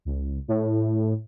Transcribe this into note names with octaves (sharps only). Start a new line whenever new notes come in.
C#2
A2